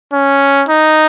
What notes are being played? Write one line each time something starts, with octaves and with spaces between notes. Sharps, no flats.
C#4
D#4